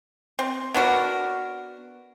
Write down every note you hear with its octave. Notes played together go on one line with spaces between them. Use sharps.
C4
B3 D4 F#4 A#4